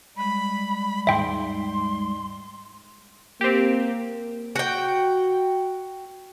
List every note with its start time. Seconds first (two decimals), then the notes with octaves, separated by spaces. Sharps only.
0.17 G3 G#3 B5
1.07 D#2 G#2 D#4 E5 G5 C6
3.41 A#3 C4 G4
4.56 F#4 G5